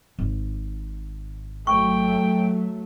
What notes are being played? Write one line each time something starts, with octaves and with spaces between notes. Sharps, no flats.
G#1
F#3 A3 G5 C#6